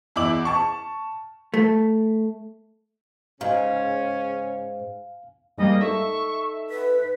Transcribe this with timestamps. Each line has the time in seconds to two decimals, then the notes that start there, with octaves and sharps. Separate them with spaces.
0.16 E2 E4 D6 F#7
0.45 A5 C#6
1.54 A3
3.41 G#2 C#3 C#4 F5 G#5
5.58 G#2 G3 A#3 D#5
5.81 D#4 A4 E5 C#6
6.70 B4 B6